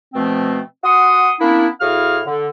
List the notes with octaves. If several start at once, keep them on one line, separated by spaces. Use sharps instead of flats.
B2 F3 A3 C4
F#4 F#5 C6 D#6
A#3 B3 C#4 D4 E4
A2 E4 F#4 G#4 F5 F6
D3